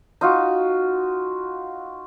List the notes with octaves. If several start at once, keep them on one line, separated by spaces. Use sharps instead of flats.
D#4 F4 F#4